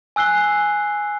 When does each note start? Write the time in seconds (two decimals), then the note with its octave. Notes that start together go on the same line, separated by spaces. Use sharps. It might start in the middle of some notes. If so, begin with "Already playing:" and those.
0.16 G#5 E6 F#6 C7 G7